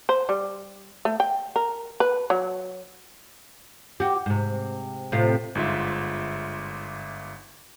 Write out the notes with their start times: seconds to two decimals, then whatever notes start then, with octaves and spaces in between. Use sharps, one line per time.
0.09 C5
0.29 G3
1.05 A3
1.20 G5
1.56 A#4
2.00 B4
2.30 F#3
4.00 F#4 G4
4.26 G#2 C3
5.12 A2 C3 F4
5.55 G1 G#2 F4 E5